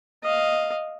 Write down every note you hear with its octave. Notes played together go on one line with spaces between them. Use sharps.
D#5 F5